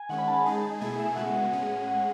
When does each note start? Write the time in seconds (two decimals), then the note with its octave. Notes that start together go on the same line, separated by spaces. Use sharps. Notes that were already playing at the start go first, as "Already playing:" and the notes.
Already playing: G#5
0.09 D#3 G#3 C#4 F#5
0.18 B5
0.28 A5
0.36 B5
0.45 G#3 D#4 G#4 A5
0.63 A5
0.81 B2 A3 E4 G#4 G#5
0.99 E5
1.16 C#3 G#3 B3 F#4 F#5
1.52 A2 G#3 C#4 G#4
1.87 F#5